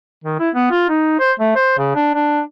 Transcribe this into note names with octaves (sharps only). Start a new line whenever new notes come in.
D#3
E4
B3
F4
D#4
C5
A3
C5
C#3
D4
D4